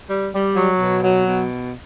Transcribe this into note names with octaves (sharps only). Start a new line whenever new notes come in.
G3
G3
F#3
B2
F#3
B2